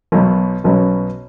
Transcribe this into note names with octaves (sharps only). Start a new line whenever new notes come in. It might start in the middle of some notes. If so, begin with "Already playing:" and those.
B1 B2 F#3
B1 B2 F#3 C#4